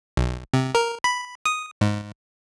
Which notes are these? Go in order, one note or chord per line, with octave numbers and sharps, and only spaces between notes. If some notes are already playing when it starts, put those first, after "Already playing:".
B1
C3
A#4
B5
D#6
G#2